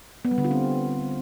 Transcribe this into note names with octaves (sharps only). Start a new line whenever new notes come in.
B3
G3
D3
F4
C4